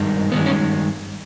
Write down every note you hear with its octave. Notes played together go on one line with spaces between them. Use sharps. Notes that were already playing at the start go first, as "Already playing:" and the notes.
Already playing: G2 D#3 G#3
G2 D#3 G#3 B3
C#4